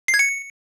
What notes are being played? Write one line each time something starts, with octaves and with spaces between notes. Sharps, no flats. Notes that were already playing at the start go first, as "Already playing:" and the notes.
C7
G#6
C#7